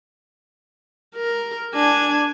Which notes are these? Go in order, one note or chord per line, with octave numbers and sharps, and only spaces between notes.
A#4
D4 G#5